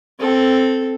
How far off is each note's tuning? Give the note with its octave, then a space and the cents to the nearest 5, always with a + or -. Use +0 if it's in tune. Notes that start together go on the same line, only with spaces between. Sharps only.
C4 +0 A4 +0